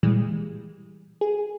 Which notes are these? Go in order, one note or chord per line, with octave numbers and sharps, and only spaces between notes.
A#2 E3 G3 G#3
G#4